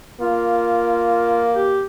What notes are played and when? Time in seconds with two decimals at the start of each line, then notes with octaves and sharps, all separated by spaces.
0.21 A#3 F4
1.55 G4